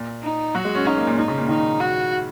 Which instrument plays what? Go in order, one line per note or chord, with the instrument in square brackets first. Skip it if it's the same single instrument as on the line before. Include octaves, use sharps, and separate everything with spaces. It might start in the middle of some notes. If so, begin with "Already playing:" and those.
Already playing: [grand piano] A#2
[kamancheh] D#4
[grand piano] F#3 [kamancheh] F#4
[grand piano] G#3
C#4
[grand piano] C#4 [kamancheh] D#4
[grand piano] A#3
A#2
[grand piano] G#2 [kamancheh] D#4
[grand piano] C#3
A#2
[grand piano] D#3 [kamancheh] D#4
[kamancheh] F#4